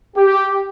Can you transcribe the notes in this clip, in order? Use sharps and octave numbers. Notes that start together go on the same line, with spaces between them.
G4